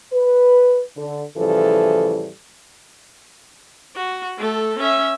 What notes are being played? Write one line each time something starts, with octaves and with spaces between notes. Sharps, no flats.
B4
D3
A2 C#3 E3 F3 G3 A4
F#4
A3 A4
C#4 E5